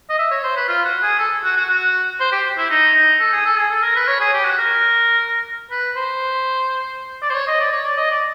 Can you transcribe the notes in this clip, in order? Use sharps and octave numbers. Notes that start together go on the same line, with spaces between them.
D#5
E5
C#5
C5
B4
F4
F#4
G#4
A4
F#4
F#4
F#4
C5
G4
E4
D#4
D#4
A4
G#4
A4
G#4
A4
A#4
B4
C#5
G#4
G4
F#4
A#4
B4
C5
D5
C5
C#5
D#5
D5
C#5
D5
D#5
D5